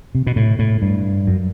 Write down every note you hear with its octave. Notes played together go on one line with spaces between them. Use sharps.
C3
B2
A2
A2
G2
F#2